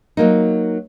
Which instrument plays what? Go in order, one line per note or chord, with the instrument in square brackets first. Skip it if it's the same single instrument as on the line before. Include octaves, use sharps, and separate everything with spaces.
[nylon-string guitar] F#3 A#3 D#4